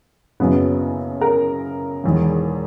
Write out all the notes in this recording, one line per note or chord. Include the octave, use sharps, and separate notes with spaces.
F#1 F#2 C#3 F#3 B3
A#4
E1 E2 D#3